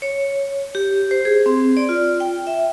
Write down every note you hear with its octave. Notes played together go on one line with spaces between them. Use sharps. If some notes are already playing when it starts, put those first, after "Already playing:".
C#5
G4
C5
G#4
C4
D5
F4
G5
E5